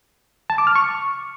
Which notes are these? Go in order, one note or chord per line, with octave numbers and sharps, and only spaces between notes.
A5
D6
F6
C#6